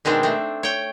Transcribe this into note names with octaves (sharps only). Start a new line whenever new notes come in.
B2 D#3 G#3 C4 D4
A3 C4
C#5 G5